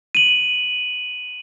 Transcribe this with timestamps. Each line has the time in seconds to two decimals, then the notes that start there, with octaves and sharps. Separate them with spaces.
0.15 D#7 F#7